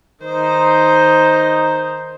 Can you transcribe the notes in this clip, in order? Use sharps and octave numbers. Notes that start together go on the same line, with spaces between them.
D#3 D#4 C5